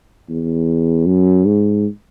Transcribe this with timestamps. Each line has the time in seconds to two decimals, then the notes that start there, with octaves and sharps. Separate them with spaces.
0.29 E2
1.06 F#2
1.45 G#2